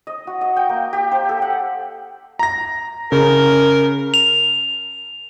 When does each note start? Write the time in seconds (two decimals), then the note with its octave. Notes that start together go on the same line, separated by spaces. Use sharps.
0.07 D#5
0.27 F#4
0.41 D#5
0.56 G5
0.69 A#3
0.93 G4
1.11 C5
1.29 A4
1.42 F#5
2.39 A#5 A#6
3.12 C#3 A#4
4.14 F7